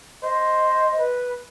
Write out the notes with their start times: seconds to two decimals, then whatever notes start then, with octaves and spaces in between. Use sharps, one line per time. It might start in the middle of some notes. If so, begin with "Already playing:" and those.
0.23 C5 D#5
0.98 B4